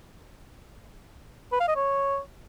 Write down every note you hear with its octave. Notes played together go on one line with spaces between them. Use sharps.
B4
F5
D#5
C#5